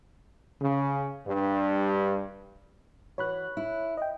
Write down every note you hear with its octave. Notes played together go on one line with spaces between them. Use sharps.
C#3
G2
E3 F#4 C#5 B5 F#6
E4
D#5 G5